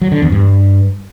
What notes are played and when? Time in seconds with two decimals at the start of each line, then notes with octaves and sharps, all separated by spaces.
0.02 F#3
0.12 D3
0.22 E2
0.32 G2